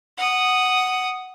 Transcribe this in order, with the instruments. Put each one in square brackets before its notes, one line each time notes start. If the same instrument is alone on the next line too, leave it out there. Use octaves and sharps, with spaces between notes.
[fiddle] F#5 D#6